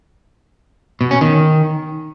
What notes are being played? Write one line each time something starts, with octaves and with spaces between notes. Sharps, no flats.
B2
C#4
D#3